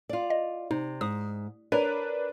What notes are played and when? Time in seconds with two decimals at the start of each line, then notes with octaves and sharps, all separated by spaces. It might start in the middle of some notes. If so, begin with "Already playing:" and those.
0.09 F4 D5
0.30 D#5
0.71 C3 D#4
1.01 G#2 D#6
1.72 D4 A#4 B4 C#5